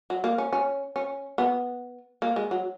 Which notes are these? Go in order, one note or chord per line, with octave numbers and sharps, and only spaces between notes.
F#3
A#3
C#4
C#4
C#4
B3
A#3
G#3
F#3